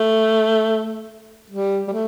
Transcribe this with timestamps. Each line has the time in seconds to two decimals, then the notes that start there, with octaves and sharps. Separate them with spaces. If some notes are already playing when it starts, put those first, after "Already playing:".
Already playing: A3
1.50 G3
1.88 G3
1.92 A3